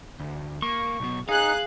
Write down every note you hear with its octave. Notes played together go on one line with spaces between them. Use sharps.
D2
A#3 C#6
B1 B2
D#4 G#4 F5 F#6